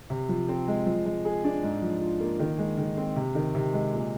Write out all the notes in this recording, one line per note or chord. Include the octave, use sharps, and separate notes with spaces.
C3
F3
C4
G#3
F3
G#3
G#4
D4
G#2
F3
F4
A#3
D#3
G#3
D#3
C4
C3
D#3
C3
G#3
A#2